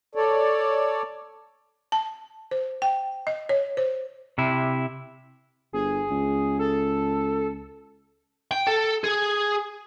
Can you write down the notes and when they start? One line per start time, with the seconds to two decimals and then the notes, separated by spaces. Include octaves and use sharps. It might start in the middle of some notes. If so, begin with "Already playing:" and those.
0.15 A4 C#5 D5
1.92 A5
2.51 C5
2.82 G5
3.27 D#5
3.49 C#5
3.77 C5
4.38 C3 E4
5.73 G1 G#4
6.10 C#2
6.59 A4
8.51 G5
8.67 A4
9.04 G#4